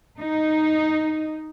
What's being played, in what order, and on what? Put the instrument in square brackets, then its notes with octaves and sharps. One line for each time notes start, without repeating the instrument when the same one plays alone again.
[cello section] D#4